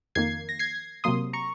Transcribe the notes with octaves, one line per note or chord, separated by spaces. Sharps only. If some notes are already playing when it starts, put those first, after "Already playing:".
F2 D#3 A#3 G#6 C7
A#6
G#6 C7
C3 F#3 A#3 C6 D#6
A#5 C#6